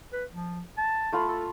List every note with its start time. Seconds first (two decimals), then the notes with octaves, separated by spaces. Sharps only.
0.12 B4
0.32 F3
0.78 A5
1.12 A3 F4 B5
1.27 A4